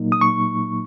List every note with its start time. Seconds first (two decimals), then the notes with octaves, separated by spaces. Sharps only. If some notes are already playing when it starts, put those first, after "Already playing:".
Already playing: A#2 F#3 A#3 D#4
0.12 D#6
0.21 C#6